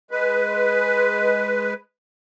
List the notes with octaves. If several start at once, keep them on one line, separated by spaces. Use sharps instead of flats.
G#3 B4